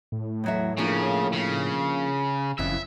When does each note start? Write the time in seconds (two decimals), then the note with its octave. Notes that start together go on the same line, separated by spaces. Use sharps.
0.12 A2
0.44 E2 F#3 E5
0.78 C#3 F3 A#3 D4
1.34 C#3
2.59 F#1 F2 C#3 E3 E5